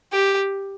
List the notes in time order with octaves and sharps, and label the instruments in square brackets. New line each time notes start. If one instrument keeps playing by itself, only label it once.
[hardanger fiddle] G4